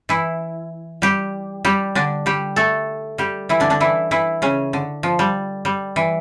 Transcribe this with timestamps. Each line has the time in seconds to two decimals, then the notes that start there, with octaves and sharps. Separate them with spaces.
0.09 E3 E4
1.02 G3 G4
1.65 G3 G4
1.95 D3 D4
2.26 G3 G4
2.56 A3 A4
3.18 G3 G4
3.49 E3 E4
3.60 D3 D4
3.70 D3 D4
3.80 E3 E4
4.11 E3 E4
4.42 C#3 C#4
4.73 D3
5.03 F3
5.19 G3
5.65 G3
5.96 E3